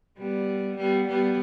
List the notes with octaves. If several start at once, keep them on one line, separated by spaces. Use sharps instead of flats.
G3 B3
G3 B3
G3 B3